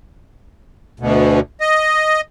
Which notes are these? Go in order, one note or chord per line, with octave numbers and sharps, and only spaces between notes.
D2 B2
D#5